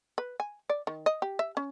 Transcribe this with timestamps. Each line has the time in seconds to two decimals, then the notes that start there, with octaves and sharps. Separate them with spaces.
0.18 B4
0.40 G#5
0.70 D5
0.87 D#3
1.06 D#5
1.22 G4
1.39 E5
1.57 C#4